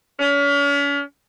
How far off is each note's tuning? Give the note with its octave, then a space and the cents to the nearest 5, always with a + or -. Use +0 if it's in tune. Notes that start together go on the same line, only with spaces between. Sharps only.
C#4 +40